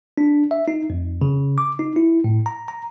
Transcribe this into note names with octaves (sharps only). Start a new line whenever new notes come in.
D4
E5
D#4
F2
C#3
D6
D#4
E4
A2
A#5
A#5